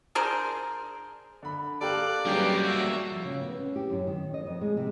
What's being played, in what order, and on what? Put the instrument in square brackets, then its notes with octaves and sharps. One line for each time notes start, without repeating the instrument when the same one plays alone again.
[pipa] D4 G#4 A#4 C5
[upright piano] D3 B5
[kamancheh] A#3 F#6 [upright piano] G4 A4 [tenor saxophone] D5
[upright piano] F#3 C#4 G#4 [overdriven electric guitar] G3 A#3 [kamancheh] G4 B4
[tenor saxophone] F#4 [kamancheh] E5
[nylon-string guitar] F3
C#3
B3
C#4
G4
F#2
D#3
D#5
F2
G#3
C3